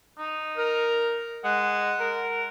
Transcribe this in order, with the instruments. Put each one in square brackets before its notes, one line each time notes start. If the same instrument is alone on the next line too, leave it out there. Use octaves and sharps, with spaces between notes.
[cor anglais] D#4
[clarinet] A#4
[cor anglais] G#3 [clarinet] F#5
[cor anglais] A#4